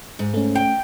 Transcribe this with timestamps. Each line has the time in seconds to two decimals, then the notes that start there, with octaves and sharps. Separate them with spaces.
0.19 G#2
0.34 A3 C#4
0.55 G5